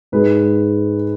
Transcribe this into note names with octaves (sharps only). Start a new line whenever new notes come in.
G#2 G#3 B4